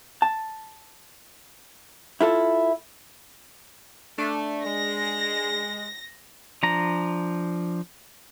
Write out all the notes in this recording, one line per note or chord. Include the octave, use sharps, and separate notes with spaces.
A5
E4 F4 A4
A3 D4
G#3 A#6
F3 D4 A#5